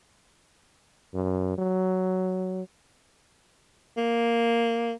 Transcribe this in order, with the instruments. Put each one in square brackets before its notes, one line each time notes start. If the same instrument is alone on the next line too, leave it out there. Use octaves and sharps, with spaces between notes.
[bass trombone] F#2
F#3
[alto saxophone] A#3